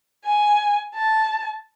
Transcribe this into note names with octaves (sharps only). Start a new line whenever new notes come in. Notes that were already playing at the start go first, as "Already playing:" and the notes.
G#5
A5